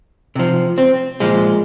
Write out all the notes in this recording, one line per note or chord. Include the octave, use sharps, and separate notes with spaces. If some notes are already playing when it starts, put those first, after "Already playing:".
C3 F3
C4
A#2 F3 G#3